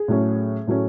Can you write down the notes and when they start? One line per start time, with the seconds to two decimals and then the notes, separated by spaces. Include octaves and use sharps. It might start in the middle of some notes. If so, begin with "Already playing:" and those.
Already playing: G#4
0.08 A2 F#3 A3 C#4
0.67 A2 F#3 A3 C#4